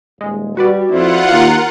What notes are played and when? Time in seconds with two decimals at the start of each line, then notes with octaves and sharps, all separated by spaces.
0.21 D#1 G#3
0.57 G3 F#4 B4 D5
0.92 F2 E4 F4 C5 F#5
1.32 D#2 A#4